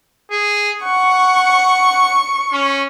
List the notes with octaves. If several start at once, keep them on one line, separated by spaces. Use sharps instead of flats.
G#4
F#5 C#6
C#4